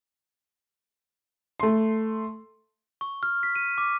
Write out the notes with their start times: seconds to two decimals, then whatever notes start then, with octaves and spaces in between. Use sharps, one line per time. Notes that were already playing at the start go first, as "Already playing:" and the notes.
1.60 A3 C6
3.01 C#6
3.23 F6
3.43 B6
3.55 D#7
3.78 D6